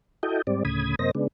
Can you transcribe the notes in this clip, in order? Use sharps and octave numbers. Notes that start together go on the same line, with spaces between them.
E4 F#4 A4 D#5 G5
G#2 G3 C4 D5
D2 A2 C#3 B5 D#6 G#6
F#2 C3 A#3 C5 D#5 A#6
C#3 G#3 B3 D4